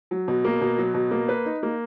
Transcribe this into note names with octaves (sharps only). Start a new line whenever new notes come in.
F#3
B2
A#3
B2
F#3
B2
A#3
B4
D#4
A#3